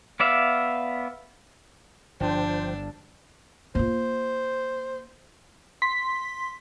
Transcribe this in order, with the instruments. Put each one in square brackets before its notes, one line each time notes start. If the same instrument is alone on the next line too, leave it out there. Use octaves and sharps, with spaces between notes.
[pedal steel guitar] B3 D5 E5 F5
[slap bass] G1 G2 [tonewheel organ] F3 C5 G5 [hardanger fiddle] D4
[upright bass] A#3 F4 [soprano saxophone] C5
[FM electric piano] C6 B6